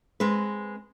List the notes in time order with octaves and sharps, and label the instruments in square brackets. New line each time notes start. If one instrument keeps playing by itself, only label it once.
[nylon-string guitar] G#3 C4 B4